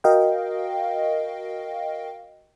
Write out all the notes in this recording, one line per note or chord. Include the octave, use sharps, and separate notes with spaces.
F#4 A#4 D#5 F5 G5